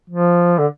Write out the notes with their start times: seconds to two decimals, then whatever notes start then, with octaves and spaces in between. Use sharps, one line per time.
0.10 F3
0.58 D3